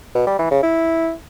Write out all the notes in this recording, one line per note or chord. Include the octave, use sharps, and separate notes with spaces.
B2
G3
E3
C#3
E4